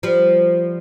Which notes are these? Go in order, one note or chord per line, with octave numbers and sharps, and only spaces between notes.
F3 G3